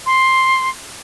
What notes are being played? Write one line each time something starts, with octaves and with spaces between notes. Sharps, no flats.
C6